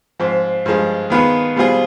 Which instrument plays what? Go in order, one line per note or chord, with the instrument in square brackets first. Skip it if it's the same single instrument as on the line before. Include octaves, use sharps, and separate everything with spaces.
[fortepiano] G#2 F3 C4
G2 F3 G#3
D#3 B3 F4 G#4
B2 G3 C4 F4 G#4